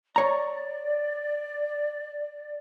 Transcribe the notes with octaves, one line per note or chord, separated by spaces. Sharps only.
C#5 D5 A#5